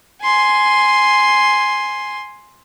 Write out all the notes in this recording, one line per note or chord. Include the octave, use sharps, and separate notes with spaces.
G#5 C6